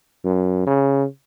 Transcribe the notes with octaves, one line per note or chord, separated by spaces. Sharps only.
F#2
C#3